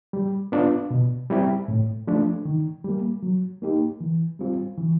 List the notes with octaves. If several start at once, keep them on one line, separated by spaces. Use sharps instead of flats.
G3
B3 D4 F4
B2
G3 C4 E4 G4
A2
F3 A3 D4
D#3
G3 A#3
F#3
A#3 D#4 G4
E3
G3 C4 F4
E3